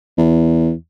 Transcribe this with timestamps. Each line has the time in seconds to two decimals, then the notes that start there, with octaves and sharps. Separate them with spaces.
0.18 E2